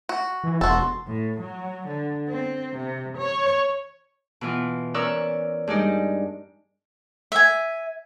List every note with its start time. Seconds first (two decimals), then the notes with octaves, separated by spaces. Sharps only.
0.09 F#4
0.44 E3
0.61 E1 F#4 A4 C6
1.07 A2
1.41 F#3
1.87 D3
2.29 C4
2.76 C3
3.18 C#5
4.41 B2 E3 F4
4.94 C#4 A#4 D5 C#6 E6 F#6
5.67 G2 G#3 D#4 D5 D#5
7.32 E5 G#5